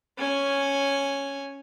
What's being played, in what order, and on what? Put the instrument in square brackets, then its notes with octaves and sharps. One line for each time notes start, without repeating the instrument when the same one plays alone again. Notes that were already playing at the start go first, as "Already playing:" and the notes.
[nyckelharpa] C#4 G#5